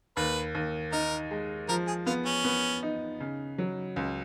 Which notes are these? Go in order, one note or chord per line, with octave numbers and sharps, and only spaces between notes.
D#2 B4
D#2
D#4 A#4
G#3
F3 A#4
G#4
B3 F4
C#4
B3
D#4
C#3
F#3
C#2